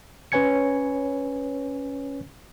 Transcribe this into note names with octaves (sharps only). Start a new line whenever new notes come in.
C#4 B4 C#5 G#5 G#6 C#7